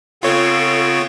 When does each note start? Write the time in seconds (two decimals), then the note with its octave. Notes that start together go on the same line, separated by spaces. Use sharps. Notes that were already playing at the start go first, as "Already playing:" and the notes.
0.23 C#3 B3 C4 F4 A4 C#5